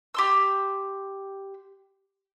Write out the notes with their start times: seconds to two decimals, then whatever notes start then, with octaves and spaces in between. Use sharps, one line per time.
0.14 G4 C6 E6